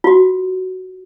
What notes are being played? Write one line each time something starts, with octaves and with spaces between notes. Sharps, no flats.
F4 F#4